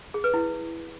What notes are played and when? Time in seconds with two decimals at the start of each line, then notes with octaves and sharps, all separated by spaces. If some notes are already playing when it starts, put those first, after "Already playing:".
0.14 G#4
0.24 B4
0.34 E4